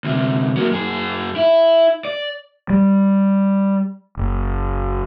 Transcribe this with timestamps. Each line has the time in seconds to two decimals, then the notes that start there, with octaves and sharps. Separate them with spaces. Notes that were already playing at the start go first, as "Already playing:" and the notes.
0.04 D2 C3
0.57 F#3 A#3
0.72 F#2 G#4
1.36 E4
2.05 D5
2.70 G3
4.17 F#1